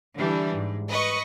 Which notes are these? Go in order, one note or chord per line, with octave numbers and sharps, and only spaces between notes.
D3 E3 G3 D4
G#2
B4 D#5 C#6